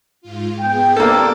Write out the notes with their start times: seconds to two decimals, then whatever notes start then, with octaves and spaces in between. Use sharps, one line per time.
0.21 G#2 F4
0.60 B3 G#4 G5
0.97 C2 G2 A#3 A4 D6 A6